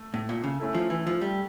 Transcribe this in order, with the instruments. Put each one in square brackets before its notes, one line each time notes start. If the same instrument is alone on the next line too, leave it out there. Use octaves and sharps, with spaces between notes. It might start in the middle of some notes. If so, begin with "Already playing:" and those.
Already playing: [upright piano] A3
[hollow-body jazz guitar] A2
A#2
C#3
[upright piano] A3 C#4 E4 A4
[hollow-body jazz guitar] F3
E3
F3
G3